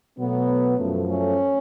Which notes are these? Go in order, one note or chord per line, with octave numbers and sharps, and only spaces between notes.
B2 F#3 A3 B3
F#2 F3 A3
A3 C#4